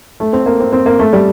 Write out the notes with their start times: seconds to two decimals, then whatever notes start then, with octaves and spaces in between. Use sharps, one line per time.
0.20 A3
0.33 C4
0.46 A#3
0.60 C4
0.73 C4
0.86 A#3
0.99 A3
1.13 G3